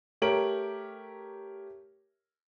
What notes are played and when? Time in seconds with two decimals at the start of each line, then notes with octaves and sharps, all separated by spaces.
0.22 A3 G4 A#4 C#5 D7 F#7